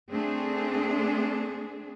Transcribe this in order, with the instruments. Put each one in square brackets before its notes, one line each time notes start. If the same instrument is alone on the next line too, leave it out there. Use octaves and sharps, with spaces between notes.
[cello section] A3 C4 D4 G#4